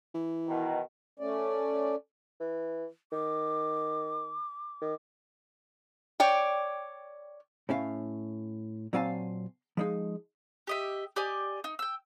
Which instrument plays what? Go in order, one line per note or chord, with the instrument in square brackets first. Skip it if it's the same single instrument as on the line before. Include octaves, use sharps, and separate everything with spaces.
[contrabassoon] E3
[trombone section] B2 D#3
[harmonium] A3 C#4 D5
[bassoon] E3
[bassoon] D#3 [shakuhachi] D6
[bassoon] D#3
[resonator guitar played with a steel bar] C#5 D5 G5
[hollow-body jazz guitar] A2 C#4 E5 F5
A#2 F#3 C4 F5 G#5 A5
F3 G#3 D#4
[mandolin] G4 D#5 E5
G4 D5 D#5 G#5
D#4
G5 E6